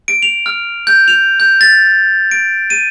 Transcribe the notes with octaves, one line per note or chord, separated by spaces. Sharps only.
D7
F7
F6
G6
F7
G6
A6
D7
D#7